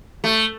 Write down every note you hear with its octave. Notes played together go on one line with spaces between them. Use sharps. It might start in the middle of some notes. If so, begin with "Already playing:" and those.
A3